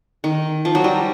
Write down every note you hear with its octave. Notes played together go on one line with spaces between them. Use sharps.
D#3
F3
F#3
G3